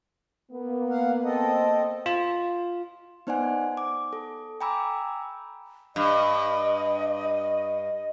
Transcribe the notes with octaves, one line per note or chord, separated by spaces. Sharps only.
A#3 B3
F5 F#5
C4 A4 D#5
F4
B3 D#4 C5 D5 F#5 G#5
D6
A4
G5 G#5 A#5 B5 D6 E6
G2 D#5